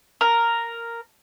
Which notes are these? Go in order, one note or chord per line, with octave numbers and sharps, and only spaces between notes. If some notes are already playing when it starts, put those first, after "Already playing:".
A#4